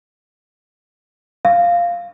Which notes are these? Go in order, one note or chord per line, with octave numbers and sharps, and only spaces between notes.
F5